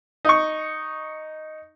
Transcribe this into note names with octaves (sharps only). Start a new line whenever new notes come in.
D#4 C#6